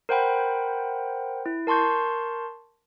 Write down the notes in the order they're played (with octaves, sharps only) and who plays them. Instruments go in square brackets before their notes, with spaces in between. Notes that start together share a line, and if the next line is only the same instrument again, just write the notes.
[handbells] A#4 C5 F#5 G5 B5
E4
A#4 A5 C6 C#6 G6